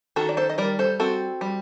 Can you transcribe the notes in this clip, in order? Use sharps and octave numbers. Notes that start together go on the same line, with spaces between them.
D#3 F#4 A4
D5
A4 C5
D#5
G3 A#4 D5
A4 C5
C4 F#4 A4
G3